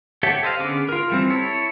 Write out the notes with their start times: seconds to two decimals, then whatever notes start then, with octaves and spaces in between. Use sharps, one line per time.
0.23 G4 A4 C#5 E5 F#5
0.43 A4 C5 D#5 F5
0.59 D3 B3 C#4 G#4 D6
0.89 F4 A#4
1.10 E3 G3 C4
1.30 E4 A4 C#5